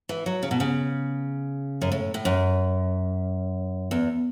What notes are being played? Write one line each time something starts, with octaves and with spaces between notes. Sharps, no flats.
E3
F#3
C#3
B2
C#3
F#2
A2
A2
F#2
E2